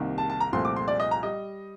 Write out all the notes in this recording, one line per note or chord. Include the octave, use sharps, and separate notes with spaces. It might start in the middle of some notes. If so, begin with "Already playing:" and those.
Already playing: C2 C3 D#3 A#3
A5
A5
A#5
C2 A#2 F3 A3 C4 C6
D6
C6
D5
D#5
A#5
G3 D#5